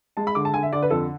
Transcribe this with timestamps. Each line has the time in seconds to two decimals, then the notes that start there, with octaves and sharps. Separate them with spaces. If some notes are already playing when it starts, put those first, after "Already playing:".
0.17 G#3 A5
0.27 B5
0.35 D3 D6
0.45 A5
0.54 D3 G#5
0.63 E5
0.73 D3 D5
0.82 B4
0.90 F2 A4